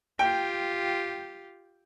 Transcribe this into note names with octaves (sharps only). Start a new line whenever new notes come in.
F4 G4 G5